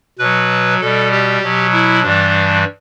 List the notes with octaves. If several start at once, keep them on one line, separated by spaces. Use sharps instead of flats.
B2 F#3 B4
B2 G3 A4
G4
B2 F#3
E4
G2 E3 G3 D4